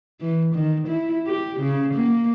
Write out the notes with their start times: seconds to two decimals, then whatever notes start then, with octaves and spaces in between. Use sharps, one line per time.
0.21 E3
0.55 D#3
0.88 E4
1.27 G4
1.60 C#3
1.94 A#3